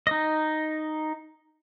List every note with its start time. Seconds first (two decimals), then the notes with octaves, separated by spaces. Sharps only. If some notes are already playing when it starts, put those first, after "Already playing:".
0.07 D#4 D#5